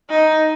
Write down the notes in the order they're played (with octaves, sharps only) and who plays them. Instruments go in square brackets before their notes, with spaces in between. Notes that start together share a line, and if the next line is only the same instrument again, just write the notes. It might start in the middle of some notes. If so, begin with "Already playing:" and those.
[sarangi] D#4